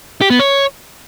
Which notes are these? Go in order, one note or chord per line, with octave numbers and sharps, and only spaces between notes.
G4
B3
C#5